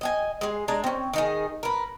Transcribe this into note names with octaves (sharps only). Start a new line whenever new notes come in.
D#5 F#5 G#5
G#3 G#4
G#3 D4 G#5 A#5
C4 C#4
D#3 D#4 G#4
A#4 B4